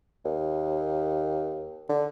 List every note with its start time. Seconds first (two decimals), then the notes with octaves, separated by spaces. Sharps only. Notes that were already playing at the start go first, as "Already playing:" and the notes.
0.25 D#2
1.89 D3